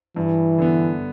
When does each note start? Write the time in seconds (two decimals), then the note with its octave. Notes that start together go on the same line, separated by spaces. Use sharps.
0.16 G2 E3
0.58 D3 B3